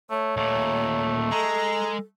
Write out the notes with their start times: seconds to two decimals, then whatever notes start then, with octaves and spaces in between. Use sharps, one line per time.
0.10 A3 C#5
0.37 D#2 A#2 A3
1.31 G#3 A4 A#5